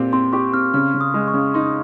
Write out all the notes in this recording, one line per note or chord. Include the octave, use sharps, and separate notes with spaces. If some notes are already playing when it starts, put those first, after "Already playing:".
Already playing: A#2 C4 G4
C4 C6
G4 C#6
C4 F6
C#3 F6
C#3
D#6
G#3
C#6
C#3
D#4 C6